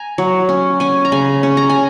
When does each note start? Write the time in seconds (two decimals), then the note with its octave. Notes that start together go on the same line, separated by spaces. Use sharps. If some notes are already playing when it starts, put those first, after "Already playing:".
Already playing: G#5 A#5
0.18 F#3
0.49 C#4
0.80 C#4 G#5
1.05 A#5
1.12 C#3 G#5
1.43 C#4
1.57 A#5
1.69 G#5